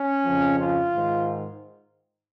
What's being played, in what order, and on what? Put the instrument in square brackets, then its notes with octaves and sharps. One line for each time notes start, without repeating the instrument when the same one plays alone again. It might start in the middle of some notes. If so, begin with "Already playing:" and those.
Already playing: [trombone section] C#4
F2 C#3 F3
F4
G#2 D#3